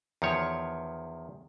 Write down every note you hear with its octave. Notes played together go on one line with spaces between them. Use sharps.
E2 D#3 F3 C#5